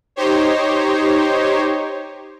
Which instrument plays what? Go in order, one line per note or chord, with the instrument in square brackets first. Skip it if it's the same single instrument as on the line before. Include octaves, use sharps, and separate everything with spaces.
[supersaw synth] D#4 G4 C5 C#5